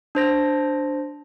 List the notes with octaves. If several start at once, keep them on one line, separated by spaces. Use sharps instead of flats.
D4 C5 A#6